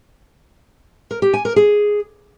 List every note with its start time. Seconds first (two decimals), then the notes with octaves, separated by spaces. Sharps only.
1.11 A#4
1.22 G4
1.34 G#5
1.45 A#4
1.56 G#4